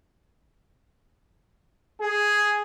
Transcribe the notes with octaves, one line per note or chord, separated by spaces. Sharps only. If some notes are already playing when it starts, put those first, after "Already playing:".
G#4